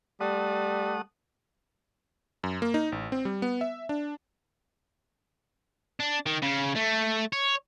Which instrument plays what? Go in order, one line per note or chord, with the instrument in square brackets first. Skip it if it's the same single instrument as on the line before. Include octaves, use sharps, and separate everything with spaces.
[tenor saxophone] G3 [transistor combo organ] A3 F#5 D#6
[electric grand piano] F#2
A#3
D#4
A1
C4
G3
B3
E5
D4
[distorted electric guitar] D4
D#3
C#3
A3
C#5